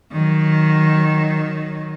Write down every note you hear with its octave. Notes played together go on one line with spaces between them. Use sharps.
D#3 F#3